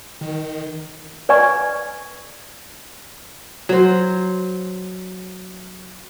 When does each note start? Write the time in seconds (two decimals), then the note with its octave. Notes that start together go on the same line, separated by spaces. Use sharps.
0.21 D#3
1.29 B4 D5 G#5 C#6
3.69 F#3 C5